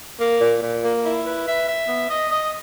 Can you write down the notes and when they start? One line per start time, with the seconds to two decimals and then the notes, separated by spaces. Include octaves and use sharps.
0.19 A#3
0.40 A#2
0.62 A#2
0.83 A#3
1.04 E4
1.25 B4
1.46 E5
1.66 E5
1.88 B3
2.09 D#5
2.30 D#5